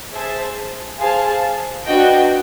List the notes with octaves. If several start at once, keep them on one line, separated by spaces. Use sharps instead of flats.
G#4 C5 E5 A5
G#4 C5 F5 A5
D4 F#4 B4 D#5 G5